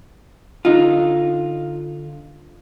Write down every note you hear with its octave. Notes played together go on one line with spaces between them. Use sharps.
D3 D#4 F4